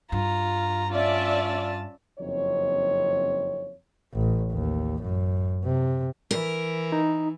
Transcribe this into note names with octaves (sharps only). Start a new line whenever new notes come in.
G2 F4 A#5
C#4 F4 D5 E5 A5
F#1 F2 C4 D#4 C#5
A1
D#2
F#2
C3
E3 A#4
D#4